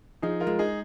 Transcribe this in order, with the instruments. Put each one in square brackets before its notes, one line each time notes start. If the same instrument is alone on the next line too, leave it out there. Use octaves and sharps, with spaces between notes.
[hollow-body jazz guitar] F3 [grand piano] D#4 G#4
[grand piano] F4 A#4
[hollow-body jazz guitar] G#3
[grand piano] D#4 G#4